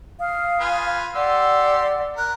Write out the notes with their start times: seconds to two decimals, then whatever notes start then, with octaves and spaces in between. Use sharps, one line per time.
0.20 F5 D#6 F6
0.60 F4 B4 G#5
1.15 G4 D5 F#5 C6 E6
2.17 A#4 F#6